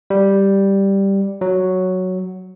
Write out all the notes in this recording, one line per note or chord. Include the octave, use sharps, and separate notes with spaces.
G3
F#3